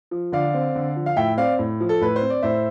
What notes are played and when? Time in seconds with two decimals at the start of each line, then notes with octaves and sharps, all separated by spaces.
0.11 F3
0.32 D3 D5 F5
0.54 C4
0.75 D3
0.96 F3
1.06 F5
1.16 A2 E5 G5
1.38 C4 D5 F5
1.59 A2
1.80 F3
1.89 A4
2.01 A2 B4
2.16 C5
2.21 C4
2.30 D5
2.42 A2 C5 E5